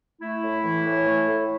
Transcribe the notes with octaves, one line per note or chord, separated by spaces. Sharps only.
A3 E4
A2
E3
A2
A3
A2